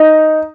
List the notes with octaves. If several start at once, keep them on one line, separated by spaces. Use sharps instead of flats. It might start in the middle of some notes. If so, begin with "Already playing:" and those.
Already playing: D#4